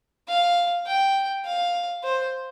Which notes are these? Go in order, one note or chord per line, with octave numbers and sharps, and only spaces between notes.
F5
G5
F5
C5